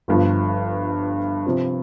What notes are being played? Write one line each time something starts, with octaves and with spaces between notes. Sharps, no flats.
G1 G2 F3
C3 F3 C4